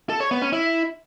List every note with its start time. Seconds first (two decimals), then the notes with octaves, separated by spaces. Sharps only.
0.09 A4
0.20 C#5
0.31 B3
0.42 C#4
0.53 E4